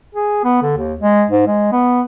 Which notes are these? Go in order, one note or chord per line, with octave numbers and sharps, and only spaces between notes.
G#4
B3
D3
D#2
G#3
G#2
G#3
B3